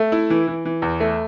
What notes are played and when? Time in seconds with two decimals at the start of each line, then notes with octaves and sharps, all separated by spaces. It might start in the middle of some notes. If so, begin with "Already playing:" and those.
Already playing: A3
0.12 E4
0.30 E3
0.48 E3
0.65 E3
0.82 E2
1.00 A3